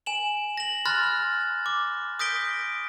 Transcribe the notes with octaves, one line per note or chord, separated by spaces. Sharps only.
G#5 E7 F#7
A#6 F#7
B5 C6 F6 F#6 A6 A#6
D6
D#6 G6 A#6 B6 D7 G7